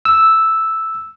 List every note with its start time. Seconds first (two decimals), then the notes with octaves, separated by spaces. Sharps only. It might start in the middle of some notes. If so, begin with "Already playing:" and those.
0.05 E6